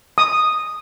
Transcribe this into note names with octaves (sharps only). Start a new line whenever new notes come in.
D#6